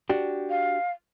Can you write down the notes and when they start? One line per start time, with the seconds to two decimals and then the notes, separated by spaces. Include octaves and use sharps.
0.10 D4 F#4 G4
0.50 F5